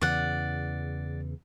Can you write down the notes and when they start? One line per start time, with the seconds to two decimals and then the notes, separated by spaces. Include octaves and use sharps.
0.01 E2 C#3 E3 D5 F#5